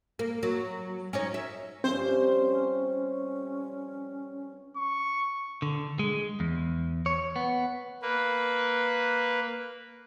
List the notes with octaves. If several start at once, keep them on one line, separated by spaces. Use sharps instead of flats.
A#3
F#3
C#4 D#4 C#5
E5
G2 C3 F3 C4 C#4 C5
C#6
D3
G#3
E2
C#5
B3
A#3 B4